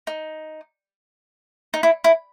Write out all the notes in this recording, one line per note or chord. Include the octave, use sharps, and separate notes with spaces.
D#4
D#4
E4
E4